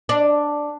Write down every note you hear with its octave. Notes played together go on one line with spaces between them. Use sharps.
D4